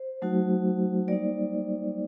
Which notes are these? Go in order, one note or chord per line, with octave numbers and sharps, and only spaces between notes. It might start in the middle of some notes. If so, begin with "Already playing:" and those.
Already playing: C5
F#3 A3 D#4 F#4
G3 A#3 D#4 D5